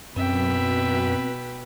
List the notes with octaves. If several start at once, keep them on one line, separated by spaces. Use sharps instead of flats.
F#2 B2 C4 B4 E5 G5